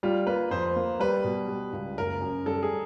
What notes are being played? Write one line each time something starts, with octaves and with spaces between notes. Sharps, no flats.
G3 F4
A#3 B4
F2 C5
A#3
G3 B4
B2
G3
C#2
F#1 A#4
F#2
G3 A4
G#4